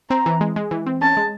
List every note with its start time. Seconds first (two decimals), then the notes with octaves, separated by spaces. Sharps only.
0.10 C4 A#5
0.26 E3
0.41 G#3
0.56 G#3
0.71 E3
0.86 C4
1.01 C#4 A5
1.17 G#3